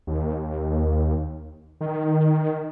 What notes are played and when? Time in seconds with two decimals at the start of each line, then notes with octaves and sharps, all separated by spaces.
0.07 D#2
1.81 D#3